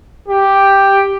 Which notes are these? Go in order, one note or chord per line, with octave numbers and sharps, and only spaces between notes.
G4